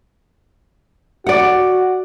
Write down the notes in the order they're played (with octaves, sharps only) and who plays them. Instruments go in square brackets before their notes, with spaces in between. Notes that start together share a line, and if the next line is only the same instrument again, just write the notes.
[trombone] F#4 [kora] D5 F#5